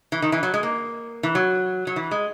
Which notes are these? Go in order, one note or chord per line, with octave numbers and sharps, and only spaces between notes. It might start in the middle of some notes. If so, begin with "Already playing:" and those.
E3
D#3
E3
F#3
G#3
A#3
E3
F#3
F#3
E3
G#3